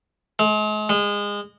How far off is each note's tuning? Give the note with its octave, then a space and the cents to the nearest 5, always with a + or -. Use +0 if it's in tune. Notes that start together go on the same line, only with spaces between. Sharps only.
G#3 +40
G#3 -25